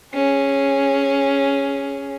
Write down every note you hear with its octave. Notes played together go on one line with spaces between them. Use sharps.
C#4 G#4